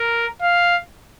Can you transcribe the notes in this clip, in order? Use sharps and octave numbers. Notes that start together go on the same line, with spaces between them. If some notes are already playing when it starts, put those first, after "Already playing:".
Already playing: A#4
F5